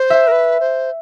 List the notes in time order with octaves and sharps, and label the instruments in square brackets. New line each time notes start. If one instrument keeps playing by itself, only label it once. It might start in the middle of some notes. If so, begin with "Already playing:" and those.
Already playing: [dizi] C5
[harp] E5
[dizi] A#4
B4
C5